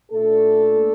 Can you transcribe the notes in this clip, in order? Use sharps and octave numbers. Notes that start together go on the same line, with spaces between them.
A#2 A3 D4 A4